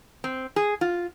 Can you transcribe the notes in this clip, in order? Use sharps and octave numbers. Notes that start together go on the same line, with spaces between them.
C4
G#4
F4